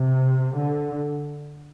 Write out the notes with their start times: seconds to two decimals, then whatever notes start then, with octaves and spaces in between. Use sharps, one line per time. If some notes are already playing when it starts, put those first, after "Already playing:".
Already playing: C3
0.57 D3